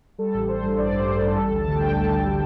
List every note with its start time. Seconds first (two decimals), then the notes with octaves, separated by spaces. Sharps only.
0.18 G3 A4
0.34 A1
0.48 A1 C5
0.63 G2
0.78 A1 D5
0.92 G2
0.98 C5
1.08 G3
1.17 A1 A4
1.36 G3 A4
1.51 D2
1.57 A5
1.67 D3
1.76 G5
1.82 G3
1.96 D2 A5
2.10 D3
2.25 G3